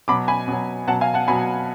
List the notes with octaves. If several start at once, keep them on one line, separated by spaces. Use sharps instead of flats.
B2 F#3 B5 D6
G#5 B5
B2 F#3
B2 F#3 F#5 A5
F5 G#5
F#5 A5
B2 F#3 G#5 B5